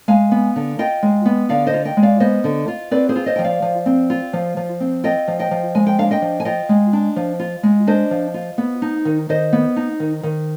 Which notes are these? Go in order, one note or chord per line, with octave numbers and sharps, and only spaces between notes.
G#3 F5 G#5
B3
D3
F4 D#5 G5
G#3
B3
D3 D5 F5
C5 D#5
F4
D#5 G5
G#3
D5 F5
B3 C5 D#5
D3
F4
C4 B4 D5
G#4 C5
F4
C5 D#5
F3 G5
D5 F5
F3
C4
F4
F3
F3
C4
F4 D#5 G5
F3
D#5 G5
F3
G#3 G#5
G5
D4 F5
D#5 G5
F3
G#5
F4 D#5 G5
G#3
D4
F3
F4
G#3
D4 C5 D#5
F3
F4
B3
D#4
D#3
D#3 C5 D#5
B3
D#4
D#3
D#3